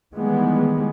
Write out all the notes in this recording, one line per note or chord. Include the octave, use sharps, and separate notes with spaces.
D#3 E3 G3 G#3 B3